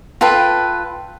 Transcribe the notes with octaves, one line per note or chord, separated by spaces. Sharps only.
F4 A4 B4 G5